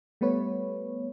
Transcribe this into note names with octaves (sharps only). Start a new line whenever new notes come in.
G3 A3 B3 B4 C#5